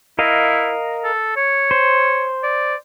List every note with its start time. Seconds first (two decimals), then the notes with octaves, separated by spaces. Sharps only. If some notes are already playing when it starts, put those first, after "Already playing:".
0.19 E4 A#4 D#5 F5
1.04 A4
1.37 C#5
1.71 C5
2.43 D5